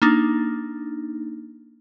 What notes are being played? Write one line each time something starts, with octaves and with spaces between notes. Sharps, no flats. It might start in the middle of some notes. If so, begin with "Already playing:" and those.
A#3 D4 D#4